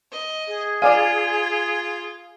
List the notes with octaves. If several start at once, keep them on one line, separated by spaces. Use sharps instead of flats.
D#5
G#4
F4 D5 F5 G#5